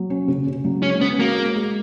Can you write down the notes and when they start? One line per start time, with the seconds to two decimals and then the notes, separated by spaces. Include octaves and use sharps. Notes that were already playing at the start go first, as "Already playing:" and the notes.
Already playing: F#3
0.10 C#4
0.28 C#3
0.47 C#3
0.64 F#3
0.83 G#3 C#4
1.01 B3 C#4
1.20 A#3 F#4
1.38 G#3
1.56 G#3